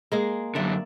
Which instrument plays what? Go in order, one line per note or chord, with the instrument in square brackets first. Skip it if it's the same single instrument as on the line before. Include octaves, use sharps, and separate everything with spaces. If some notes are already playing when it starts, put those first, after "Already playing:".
[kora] G#3 A#3 G#4
[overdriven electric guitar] F#2 D3 [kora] D5 E5